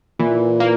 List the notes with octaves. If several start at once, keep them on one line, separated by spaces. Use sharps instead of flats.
A#2 E3
A#3